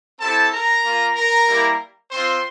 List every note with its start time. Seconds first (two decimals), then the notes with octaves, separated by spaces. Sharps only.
0.20 C4 E4 G4 A4 A5
0.51 A#4 A#5
0.83 A#3 F4
1.15 A#4 A#5
1.47 G3 A#3 E4 G4
2.11 C4 F4 C5 C6